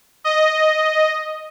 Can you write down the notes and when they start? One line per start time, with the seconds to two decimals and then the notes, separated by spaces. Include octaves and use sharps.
0.24 D#5